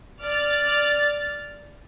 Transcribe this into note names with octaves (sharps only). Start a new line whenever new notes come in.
D5 F6 A6